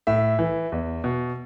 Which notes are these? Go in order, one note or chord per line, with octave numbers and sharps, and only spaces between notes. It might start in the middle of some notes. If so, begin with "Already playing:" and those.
A2 E5
E3
E2
B2